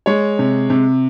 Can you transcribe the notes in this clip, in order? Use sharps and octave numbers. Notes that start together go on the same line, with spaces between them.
G#3 C#5
C3
C3